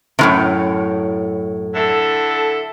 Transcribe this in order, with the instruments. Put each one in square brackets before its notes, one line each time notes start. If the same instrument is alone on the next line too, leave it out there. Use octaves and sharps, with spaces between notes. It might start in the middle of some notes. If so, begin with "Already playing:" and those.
[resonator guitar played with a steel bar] F#2 A2 C3
[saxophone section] D3 E4 A4